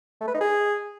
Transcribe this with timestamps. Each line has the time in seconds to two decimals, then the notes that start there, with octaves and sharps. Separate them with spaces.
0.21 A3
0.27 B4
0.34 D#4
0.41 G#4